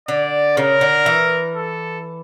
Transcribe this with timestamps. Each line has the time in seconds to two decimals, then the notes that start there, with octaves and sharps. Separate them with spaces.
0.08 D3 D5
0.57 C#3 A#4
0.81 D3
1.06 E3
1.55 A4